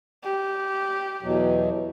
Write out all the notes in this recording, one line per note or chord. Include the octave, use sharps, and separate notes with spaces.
G4
E2 B2 F#3